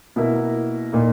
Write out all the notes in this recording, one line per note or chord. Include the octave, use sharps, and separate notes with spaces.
B2 A#3 E4 A#4
A#2 A#3 D#4